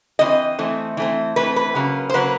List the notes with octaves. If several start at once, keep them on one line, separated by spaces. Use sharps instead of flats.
E3 A3 C4 D#5
E3 A3 C4
E3 A3 C4
E3 A3 C4 B4
B4
C#3 F#3 A#3
C5
C#3 F#3 A#3 B4